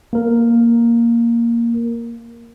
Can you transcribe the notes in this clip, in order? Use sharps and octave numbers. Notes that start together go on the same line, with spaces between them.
A#3 A#4